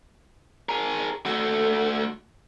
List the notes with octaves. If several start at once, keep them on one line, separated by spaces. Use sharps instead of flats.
G#4 A#4
A3 F#4 A4